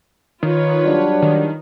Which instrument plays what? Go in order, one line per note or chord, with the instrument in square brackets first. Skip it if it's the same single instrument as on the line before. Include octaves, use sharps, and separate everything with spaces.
[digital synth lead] D#3 [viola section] F4 B4 C#5
[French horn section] F#3 G3 D4
[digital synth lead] D#3